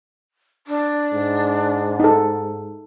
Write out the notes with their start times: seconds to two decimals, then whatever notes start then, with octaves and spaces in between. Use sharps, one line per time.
0.67 D4
1.13 G#2
2.00 D#4 A4